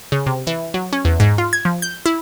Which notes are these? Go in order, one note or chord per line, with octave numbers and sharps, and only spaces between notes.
C#3
C3
E3
F#3
C#4
E2
G#2
F4
G#6
F3
G6
E4